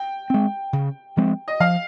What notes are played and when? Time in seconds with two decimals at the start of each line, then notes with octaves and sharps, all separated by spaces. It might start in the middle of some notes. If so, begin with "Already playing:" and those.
Already playing: G5
0.30 G#3 C4
0.73 C#3
1.17 F3 G#3 C4
1.48 D#5
1.60 F3 F5